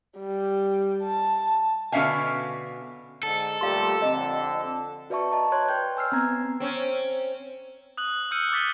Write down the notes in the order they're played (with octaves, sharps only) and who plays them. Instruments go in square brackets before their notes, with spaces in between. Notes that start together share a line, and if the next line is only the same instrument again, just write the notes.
[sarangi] G3
A5
[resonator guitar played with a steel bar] B2 D3 C#4 E5 F5 G#5
[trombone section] G#2 D3 [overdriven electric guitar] A4
[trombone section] A#2 G3 A3 [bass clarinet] G4 [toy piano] F5 C6
[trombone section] F2 D3 [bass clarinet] C4 [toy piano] D#5
[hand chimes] F#4 B4 D5 E5 A5 C#6
D#5 A5 A#5
C#5 C6 F#6 G#6
B4 G5 G6
G#5 E6 F6 C7
B3 C4 A#5 G#6
[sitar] C4 C#4
[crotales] D#6 F#6 F#7
E6 F6 G6 C#7 D#7
D6 A6 B6 G7